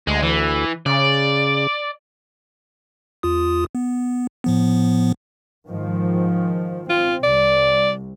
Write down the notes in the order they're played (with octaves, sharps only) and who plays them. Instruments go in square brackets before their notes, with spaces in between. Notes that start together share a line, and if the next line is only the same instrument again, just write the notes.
[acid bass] D2 [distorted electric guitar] G#3
[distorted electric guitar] E3
[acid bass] C#3 [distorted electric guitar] D5
[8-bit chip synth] E2 F4 D#6
B3
A2 F3 B3
[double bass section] G#2 D#3 F3
[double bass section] C4 [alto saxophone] F4
[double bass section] C2 [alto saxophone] D5